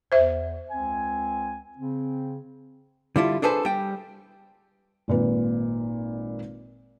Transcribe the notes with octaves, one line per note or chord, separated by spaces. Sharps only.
E2 C5 E5
C#2 C4 G#5
C#3 C4
D3 G3 E4 F4
D4 G#4 A4 B4 C5
G3 G5
G#1 A#2 B4